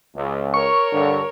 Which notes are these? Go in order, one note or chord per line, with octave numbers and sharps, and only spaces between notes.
C#2
A#4 C#5 C#6
G2 D3